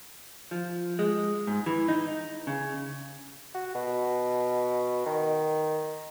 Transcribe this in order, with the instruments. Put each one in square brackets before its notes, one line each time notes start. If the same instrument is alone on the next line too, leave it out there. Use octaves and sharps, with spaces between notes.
[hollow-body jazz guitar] F3
G#3
G#2
E3
D#4
C#3
[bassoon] F#4
B2
D#3